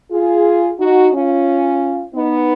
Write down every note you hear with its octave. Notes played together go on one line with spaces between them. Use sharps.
F4 G#4
D#4 F#4
C#4 F4
B3 D#4